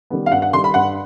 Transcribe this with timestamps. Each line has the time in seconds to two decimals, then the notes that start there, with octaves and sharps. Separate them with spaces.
0.10 D#3 G3 B3
0.26 F5
0.32 G2 F#5
0.42 F#5
0.53 D#3 G3 C6
0.64 B5
0.74 G2 F#5